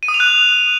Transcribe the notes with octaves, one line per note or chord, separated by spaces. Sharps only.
D#7
D#6
F7
F#6